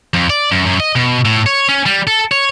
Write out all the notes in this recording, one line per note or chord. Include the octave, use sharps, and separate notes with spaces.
F2
D5
F#2
F#2
D#5
B2
A2
C#5
C#4
G3
A4
C#5